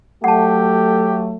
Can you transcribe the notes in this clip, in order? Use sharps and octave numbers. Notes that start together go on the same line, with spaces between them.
F#3 A3 G4 F#5 A5